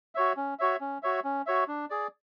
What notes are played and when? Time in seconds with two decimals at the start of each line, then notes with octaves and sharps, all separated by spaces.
0.15 F#4 C#5 E5
0.37 C#4
0.59 F#4 C#5 E5
0.81 C#4
1.03 F#4 C#5 E5
1.24 C#4
1.46 F#4 C#5 E5
1.68 D4
1.90 G#4 D5